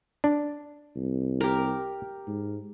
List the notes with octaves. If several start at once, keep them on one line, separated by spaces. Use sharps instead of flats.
D4
C2
G4 A#4
G#2